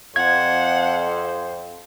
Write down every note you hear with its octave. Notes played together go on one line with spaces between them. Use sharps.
F2 C5 F#5 G#6